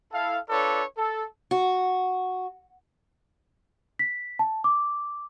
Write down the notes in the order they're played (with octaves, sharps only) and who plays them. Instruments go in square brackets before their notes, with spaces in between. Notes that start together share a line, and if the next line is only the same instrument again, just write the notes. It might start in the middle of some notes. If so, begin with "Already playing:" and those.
[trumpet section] E4 A4 F5
D4 F4 A4 B4 C#5 D5
A4
[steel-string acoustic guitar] F#4
[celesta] B6
A5
D6